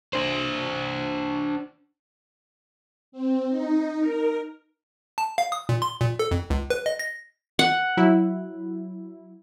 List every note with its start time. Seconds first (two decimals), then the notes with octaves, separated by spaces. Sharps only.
0.13 D4 C5
3.12 C4
3.49 D#4
4.00 A#4
5.18 A5
5.38 F5
5.52 D#6
5.69 A#2
5.82 C6
6.00 A#2
6.19 A4
6.31 F2
6.50 C#2
6.70 B4
6.86 D#5
6.99 A#6
7.59 F#5
7.97 F#3 E4